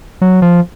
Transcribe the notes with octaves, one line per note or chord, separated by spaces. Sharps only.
F#3
F3